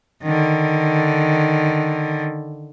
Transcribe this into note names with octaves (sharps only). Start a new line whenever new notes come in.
D3 D#3